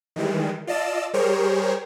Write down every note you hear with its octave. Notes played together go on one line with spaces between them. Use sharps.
D#3 E3 G3 G#3
F4 D5 D#5 A5 E6
G3 G4 G#4 A#4 C5 C#5